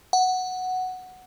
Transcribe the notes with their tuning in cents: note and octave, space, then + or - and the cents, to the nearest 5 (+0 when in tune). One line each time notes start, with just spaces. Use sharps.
F#5 +0